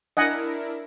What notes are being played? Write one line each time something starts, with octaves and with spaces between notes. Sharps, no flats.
D4 E4 A#4 D#5 F#5 G#5